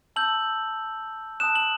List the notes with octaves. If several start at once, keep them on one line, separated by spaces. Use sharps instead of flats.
A5 E6 G6 F#7
A5 D#6 F#6 E7
F#7